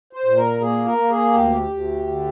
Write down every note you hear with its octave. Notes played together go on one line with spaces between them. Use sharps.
C5
A#2
A#4
A#3 G#4
A#4
A#3
G#4
D2 G4
D2
D3